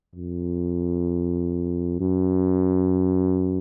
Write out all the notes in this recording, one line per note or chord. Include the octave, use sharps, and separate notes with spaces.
F2
F#2